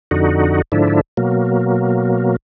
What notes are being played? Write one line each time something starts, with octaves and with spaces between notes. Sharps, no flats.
F2 D3 D#4 F#4
G#2 D3 F3 D4 E4
B2 F#3 A#3